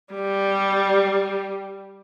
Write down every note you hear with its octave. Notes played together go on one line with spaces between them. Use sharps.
G3